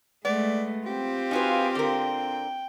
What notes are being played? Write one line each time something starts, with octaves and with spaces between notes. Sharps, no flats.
G#3 A3 B3 D5
C4 F4 G4
D#4 F#4 B4 F5 G#5
D3 A#4 G5